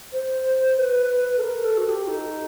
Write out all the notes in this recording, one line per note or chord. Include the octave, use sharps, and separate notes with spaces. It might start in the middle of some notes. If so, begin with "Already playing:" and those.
C5
B4
A4
A#4
A4
F#4
G4
D#4